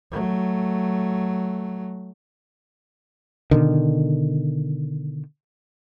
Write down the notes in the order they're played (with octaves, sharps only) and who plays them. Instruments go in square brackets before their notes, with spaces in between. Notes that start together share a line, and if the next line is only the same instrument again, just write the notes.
[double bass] F#3 A3
[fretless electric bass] B2 D3 D#3